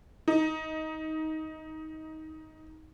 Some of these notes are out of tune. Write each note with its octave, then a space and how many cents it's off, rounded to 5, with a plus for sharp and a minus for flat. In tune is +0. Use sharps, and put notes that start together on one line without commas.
D#4 +15